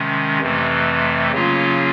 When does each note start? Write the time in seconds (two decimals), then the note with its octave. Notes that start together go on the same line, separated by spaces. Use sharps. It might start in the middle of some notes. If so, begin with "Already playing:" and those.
Already playing: C3 D#3 G#3 C#4
0.40 F2 C3 E3 A3
1.32 C#3 F#3 A#3 C#4 F4